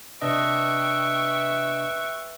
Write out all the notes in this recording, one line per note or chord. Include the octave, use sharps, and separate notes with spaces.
C3 D4 B4 D#5 E5 G5 C#6